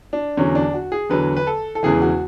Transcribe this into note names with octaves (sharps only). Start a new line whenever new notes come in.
D4
E2 D3 F#3 C#4
D4
F#4
G#4
E2 D3 F#3 B4
B4
A4
A4
E1 E2 C#3 E3 G#4
F#4